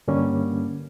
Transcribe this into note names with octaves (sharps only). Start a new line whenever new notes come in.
G2 D3 G3 A#3 C#4